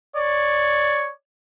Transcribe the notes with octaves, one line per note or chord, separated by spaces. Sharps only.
C#5 D5